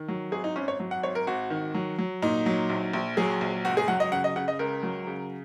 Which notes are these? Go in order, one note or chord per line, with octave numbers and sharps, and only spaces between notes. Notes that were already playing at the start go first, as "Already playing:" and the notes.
Already playing: D#3
F#3
G#1 G#4
D#4
G#1 C#4
C#5
F#3
F#5
G#1 C#5
A#4
G#1 F#4
D#3
F#3
F#3
A#2 D#4
F#3
A#1
A#1
F#3 G#4
A#1
C#2 F#4
G#4
F#3 F#5
D#5
C#3 F#5
D#5
C#3 F#5
D#5
C#2 A#4
F#3
C#3